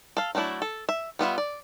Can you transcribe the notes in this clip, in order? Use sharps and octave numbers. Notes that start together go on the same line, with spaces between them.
A4 F5
F#3 A3 D4 E4
A4
E5
G3 B3 F4 E5
D5